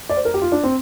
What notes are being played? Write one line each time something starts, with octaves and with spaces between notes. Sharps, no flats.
D5
C5
A#4
G4
F4
D4
C4